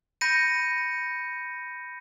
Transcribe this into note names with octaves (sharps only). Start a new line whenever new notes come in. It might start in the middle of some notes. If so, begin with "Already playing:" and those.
B5 G6 A#6 C#7 D#7